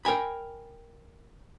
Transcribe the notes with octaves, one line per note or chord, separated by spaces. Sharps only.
A#4 G5 G#5 B5